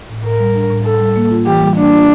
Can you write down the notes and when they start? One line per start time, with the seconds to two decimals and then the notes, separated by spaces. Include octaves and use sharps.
0.09 A2
0.24 A2 A#4
0.39 G3
0.55 D4
0.70 A2
0.85 A2 A4
1.00 G3
1.16 A#3
1.31 F4
1.46 E3 G4
1.62 G3
1.77 A#3 D4
1.93 F4